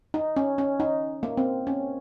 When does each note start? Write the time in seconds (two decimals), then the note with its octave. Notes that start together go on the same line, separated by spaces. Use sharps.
0.14 D#4
0.37 C#4
0.58 C#4
0.80 D#4
1.23 A#3
1.37 C4
1.67 C#4